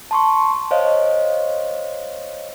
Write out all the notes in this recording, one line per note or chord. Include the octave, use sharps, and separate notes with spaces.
A5 C6 C#6
C5 C#5 D#5 F5